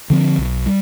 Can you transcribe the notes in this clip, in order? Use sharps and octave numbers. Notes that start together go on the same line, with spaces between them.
D3 F3 C4
B1
G3